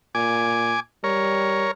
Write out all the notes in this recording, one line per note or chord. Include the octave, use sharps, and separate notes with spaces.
A#2 G#5 D6
G3 A#4 C#5